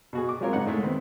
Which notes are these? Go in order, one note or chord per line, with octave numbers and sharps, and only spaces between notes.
B2 F#4 G#4
D6
F#3 G#3 C4 F4 A#4 C#5
G#2 C#3 C#4 D#4 F#5
A2 G#3 A3
D#3 B3 C4